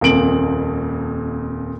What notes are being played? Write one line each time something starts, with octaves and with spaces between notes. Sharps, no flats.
D#1 F2 A#2 D7 F#7